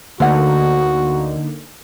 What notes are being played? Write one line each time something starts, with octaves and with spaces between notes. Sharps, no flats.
D2 D3 A#3 D#4 F#4 A4 F#5